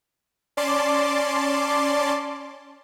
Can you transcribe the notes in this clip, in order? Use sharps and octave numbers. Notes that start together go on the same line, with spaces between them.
C#4 D5 A5 C6 D6